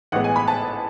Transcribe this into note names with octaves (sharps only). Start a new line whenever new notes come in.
A1 A2 G#3 B3 F#5
G#5
B5
A5